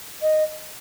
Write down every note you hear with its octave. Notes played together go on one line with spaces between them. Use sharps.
D#5